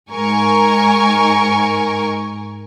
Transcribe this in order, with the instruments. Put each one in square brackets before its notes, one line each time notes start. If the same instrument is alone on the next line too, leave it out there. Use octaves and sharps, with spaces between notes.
[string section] G#2 A#4 G#5 C#6